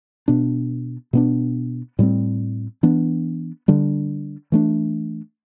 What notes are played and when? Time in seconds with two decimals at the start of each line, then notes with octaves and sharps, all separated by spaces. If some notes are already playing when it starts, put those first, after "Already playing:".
0.28 B2 B3 D4
1.13 B2 B3 D4
1.99 A2 G3 C4
2.83 E3 B3 D4
3.68 D3 G3 D4
4.52 E3 A3 D4